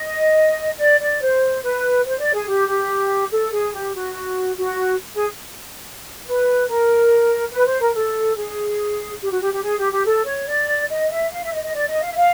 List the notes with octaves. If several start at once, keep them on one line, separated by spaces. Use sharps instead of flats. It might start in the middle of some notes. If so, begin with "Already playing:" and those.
Already playing: D#5
D5
D5
C5
B4
C5
D5
G#4
G4
G4
A4
G#4
G4
F#4
F#4
G#4
B4
A#4
B4
C5
A#4
A4
G#4
G4
F#4
G4
G4
G#4
G4
G4
A4
C#5
D5
D#5
E5
F5
E5
D#5
D#5
D5
D#5
F5
E5
F5